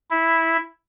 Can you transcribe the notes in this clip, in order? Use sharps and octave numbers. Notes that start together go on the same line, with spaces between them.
E4